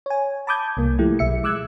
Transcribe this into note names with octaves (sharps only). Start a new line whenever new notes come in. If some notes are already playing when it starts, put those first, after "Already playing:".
C#5 G#5
A5 B5 D6 D#6 G6 G#6
C2 A#3
F3 A3 E4 G4
B1 E5 C#7
G#3 D6 E6 F#6 G#6